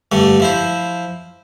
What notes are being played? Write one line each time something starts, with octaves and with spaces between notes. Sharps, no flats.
G2 D3 A3
F3 E4 C5